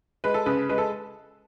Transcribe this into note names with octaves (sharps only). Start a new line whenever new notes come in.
G#3 B4
A4
C#3 B4
G#3 B4
A4